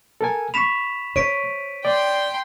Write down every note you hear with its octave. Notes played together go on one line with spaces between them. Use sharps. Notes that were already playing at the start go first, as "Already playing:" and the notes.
A4 A#4 G#5
B5 C#6 B6 E7 F7
C5 C#5 B6 D7 D#7
D5 G5 C6